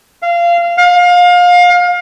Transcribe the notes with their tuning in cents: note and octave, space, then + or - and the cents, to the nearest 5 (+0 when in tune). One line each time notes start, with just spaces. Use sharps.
F5 -20
F5 +30